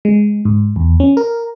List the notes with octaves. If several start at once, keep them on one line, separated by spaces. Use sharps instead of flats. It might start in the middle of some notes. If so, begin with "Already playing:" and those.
G#3
G#2
E2
C#4
A#4